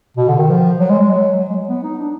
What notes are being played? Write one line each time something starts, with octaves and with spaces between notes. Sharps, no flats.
B2
D3
D#3
F3
F#3
G#3
G#3
F#3
F#3
G#3
B3
D#4
D4